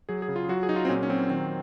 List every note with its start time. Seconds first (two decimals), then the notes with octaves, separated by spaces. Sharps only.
0.09 F#3 G#4
0.22 G#4
0.28 C#3
0.36 F4
0.49 F#3 F#4
0.63 G#4
0.69 F#3 D#4
0.76 F4
0.85 C4
0.89 A#2 C#4
1.03 C#4
1.10 F#3 C4
1.30 D#3 C4